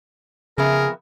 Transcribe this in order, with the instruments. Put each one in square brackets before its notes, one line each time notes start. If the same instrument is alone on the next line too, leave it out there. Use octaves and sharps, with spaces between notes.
[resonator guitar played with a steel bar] F2 B3 E5 [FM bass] C#3 [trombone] G#4 [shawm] A#4